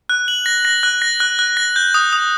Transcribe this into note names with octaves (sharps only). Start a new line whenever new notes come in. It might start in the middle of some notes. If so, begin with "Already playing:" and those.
F#6
F#7
A#6
A#6
F#6
A#6
F#6
F#6
A#6
G6
D#6
D#6